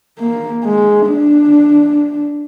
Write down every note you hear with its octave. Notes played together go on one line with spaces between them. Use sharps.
A#3
G#3
D4